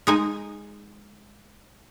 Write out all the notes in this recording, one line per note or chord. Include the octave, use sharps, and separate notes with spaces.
G#3 D#4 G#5